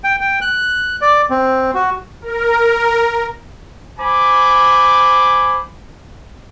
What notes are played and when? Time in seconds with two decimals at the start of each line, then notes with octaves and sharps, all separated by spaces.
0.04 G5
0.21 G5
0.41 F#6
1.01 D5
1.30 C4
1.74 F#4
2.22 A#4
4.00 C5 G#5 B5 D6